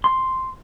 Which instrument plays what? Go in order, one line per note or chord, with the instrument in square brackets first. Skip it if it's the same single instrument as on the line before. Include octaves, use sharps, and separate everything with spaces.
[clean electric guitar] C6